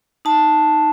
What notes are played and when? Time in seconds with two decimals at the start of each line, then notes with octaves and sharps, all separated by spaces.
0.25 D#4 A5